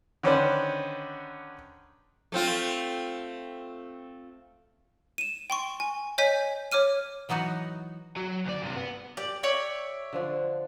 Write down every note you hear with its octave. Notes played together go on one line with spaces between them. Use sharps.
D3 D#3 C#4 B4 C5 D5
A3 C4 F4
D#7 E7
G5 C6 C#6
G#5
C#5 D#5 G#5 G6 B6
C#5 D6 F6 D#7
E3 F#3 B3 D#4 F#4
F#3
D2 D5
G2 C3
B3
G4 D5
C#5 D5 E5
D3 F3 D4